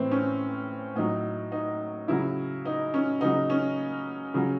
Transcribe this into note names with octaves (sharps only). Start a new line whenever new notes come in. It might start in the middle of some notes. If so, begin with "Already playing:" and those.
Already playing: A2 E3 C4
C#4
A2 F#3 D#4
D#4
C#3 F#3 E4
D#4
C#4
C#3 F#3 D#4
C#4
C#3 F#3